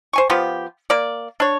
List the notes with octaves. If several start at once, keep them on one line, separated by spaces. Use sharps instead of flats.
C5 G#5 C#6
F3 B3 F4 G4
A#3 D5
D4 C#5